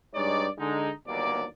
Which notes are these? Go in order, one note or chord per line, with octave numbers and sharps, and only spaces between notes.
G2 G#3 D#4 C#5 D5
D3 G#3 D#4
G1 D#2 F#3 A#3 B3 D5